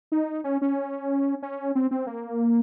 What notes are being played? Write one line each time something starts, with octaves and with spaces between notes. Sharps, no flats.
D#4
C#4
C#4
C#4
C4
C4
A#3